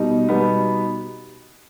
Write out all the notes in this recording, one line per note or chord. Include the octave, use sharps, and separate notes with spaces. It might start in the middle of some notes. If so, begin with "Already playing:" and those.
Already playing: B2 G3 D#4
B2 G3 B3 D#4